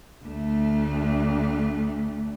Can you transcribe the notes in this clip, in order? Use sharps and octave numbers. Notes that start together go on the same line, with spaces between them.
D2 A3